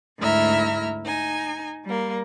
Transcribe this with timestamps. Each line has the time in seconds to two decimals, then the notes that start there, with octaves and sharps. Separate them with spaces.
0.21 D2 G#2 E4 E5 A#5 F6
1.04 D#4 G#5
1.84 G3 A#3